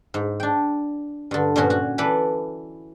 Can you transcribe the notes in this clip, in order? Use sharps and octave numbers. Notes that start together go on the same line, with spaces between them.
G#2
D4 G5
G2 D3
G2 A#2 F3 C#4 F#4
F#4
E3 A4 B4 D5